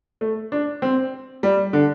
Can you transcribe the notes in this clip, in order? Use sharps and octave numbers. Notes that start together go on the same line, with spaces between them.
A3
D4
C4
G3
D3